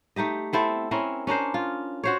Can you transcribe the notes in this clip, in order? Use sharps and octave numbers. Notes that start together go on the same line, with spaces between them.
A3 D#4 G4 D#5
B3 C4 E4 A4
C4 C#4 E4 A#4
C#4 D4 A#4 C5
F4
F#4 C5 C#5